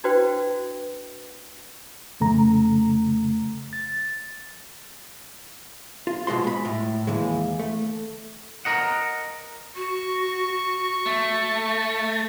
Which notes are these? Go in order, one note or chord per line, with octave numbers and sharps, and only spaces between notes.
D4 E4 F#4 B4 C5 G5
F2 C#3 A3 A#5
A6
F4
B2 G#3 F#4 C6
G#3 B5
A2
D#2 E3 G#3
A3
A#4 D#5 F#5
F#4 C#6
A3